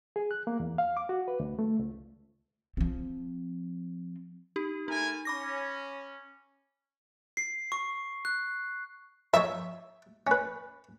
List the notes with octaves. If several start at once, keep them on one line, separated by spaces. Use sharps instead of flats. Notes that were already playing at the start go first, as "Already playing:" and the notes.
G#4
F#6
A#3
E2
F5
D6
F#4
B4
D2
A3
C#2
F3 C4
D#4 G4
A3 D#4 A#4 G#5
C#4 B5 D6 A#6
C7
C#6
F#6
F2 D#4 C#5 E5
C#4 B4